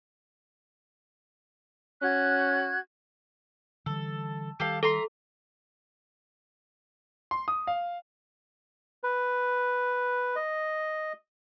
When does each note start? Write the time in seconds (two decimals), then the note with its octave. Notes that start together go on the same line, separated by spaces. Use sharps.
2.02 C#4 F#4 F#6 G#6
3.86 D3 E3 G3 A4
4.60 D#3 G3 G4 A4 F5
4.83 A4 E5 A#5 C6
7.31 C6
7.48 D#6
7.67 F5
9.04 B4
10.36 D#5